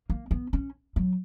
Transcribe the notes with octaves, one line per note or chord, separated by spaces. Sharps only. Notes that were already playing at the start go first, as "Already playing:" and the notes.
A#3
B3
C#4
F#3